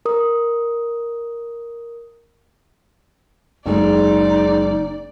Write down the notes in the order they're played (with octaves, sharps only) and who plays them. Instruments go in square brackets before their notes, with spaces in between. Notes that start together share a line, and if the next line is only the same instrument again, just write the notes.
[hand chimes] A#4 D#6
[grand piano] F#1 G#3 [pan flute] D#4 [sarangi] D5